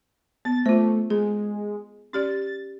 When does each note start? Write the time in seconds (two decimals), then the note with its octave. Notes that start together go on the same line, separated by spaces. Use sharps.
0.45 B3 A6
0.66 A3 F4 C5
1.10 G#3 G#4
2.13 C#4 G4 D5 A6